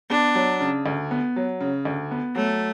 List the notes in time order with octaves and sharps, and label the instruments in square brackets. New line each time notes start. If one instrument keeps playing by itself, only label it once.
[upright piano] B3 [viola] D4
[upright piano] F#3
C#3
D2
B3
F#3
C#3
D2
B3
[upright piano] F#3 [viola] A3